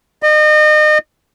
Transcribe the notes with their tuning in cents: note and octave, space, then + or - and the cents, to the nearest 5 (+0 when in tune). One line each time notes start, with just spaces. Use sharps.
D#5 -35